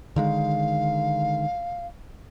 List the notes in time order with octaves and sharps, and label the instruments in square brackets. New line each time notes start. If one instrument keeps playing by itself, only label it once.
[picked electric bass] D3 D#3 G#3 [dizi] F5